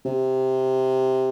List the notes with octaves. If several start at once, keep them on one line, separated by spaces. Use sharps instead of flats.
C3